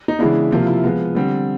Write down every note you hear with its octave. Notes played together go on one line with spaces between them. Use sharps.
D#4
C#3 E3 G#3 B3 D4 E4
C3 F3 A#3 F4
F4
E4
F3 G#3 B3 F4
D3 G3 C4